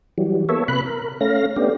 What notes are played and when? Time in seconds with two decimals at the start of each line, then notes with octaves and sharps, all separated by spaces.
0.18 E3 F#3 G3
0.49 A#3 B3 A4 C#5 E5
0.68 C3 B4 B5 F#6
0.86 A#4
1.21 A3 C#4 F5 A#6
1.56 A3 B3 C#4 D4 G4